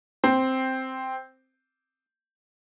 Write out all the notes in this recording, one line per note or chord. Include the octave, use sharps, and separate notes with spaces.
C4